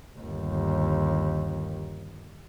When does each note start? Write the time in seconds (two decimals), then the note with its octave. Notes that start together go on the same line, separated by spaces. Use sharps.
0.18 G1 D#2